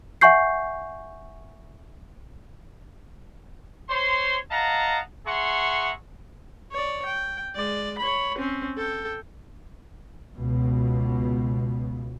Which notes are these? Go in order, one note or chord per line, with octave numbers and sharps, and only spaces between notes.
E5 F#5 G#5 C#6 G6 C7
C5 C#5 C6
D#5 F5 F#5 A5 A#5
G#4 E5 F#5 A#5 C6 C#6
C#5 D5
G5
G#3 D5
C#5 B5
C4 C#4
A4 G5
C#2 B2